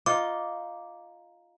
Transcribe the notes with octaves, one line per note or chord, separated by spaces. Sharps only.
D#4 F4 D6